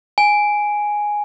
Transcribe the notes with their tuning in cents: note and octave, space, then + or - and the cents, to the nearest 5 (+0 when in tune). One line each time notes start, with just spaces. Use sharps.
G#5 +0